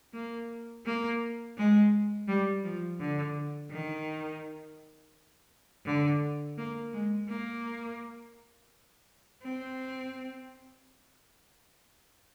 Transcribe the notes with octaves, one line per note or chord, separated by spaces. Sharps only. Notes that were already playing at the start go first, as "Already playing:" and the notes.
A#3
A#3
G#3
G3
F3
D3
D#3
D3
A#3
G#3
A#3
C4